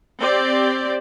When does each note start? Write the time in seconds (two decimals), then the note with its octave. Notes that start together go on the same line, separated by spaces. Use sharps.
0.19 C4 G4 D5